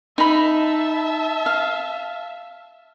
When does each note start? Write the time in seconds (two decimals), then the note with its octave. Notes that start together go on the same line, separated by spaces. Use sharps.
0.18 D#4 E5 A5 B5
1.46 F5